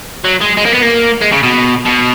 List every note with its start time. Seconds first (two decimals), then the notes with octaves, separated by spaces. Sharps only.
0.25 F#3
0.41 G#3
0.57 G#3
0.65 A#3
0.73 B3
0.82 A#3
1.21 G#3
1.32 C#3
1.43 B2
1.86 B2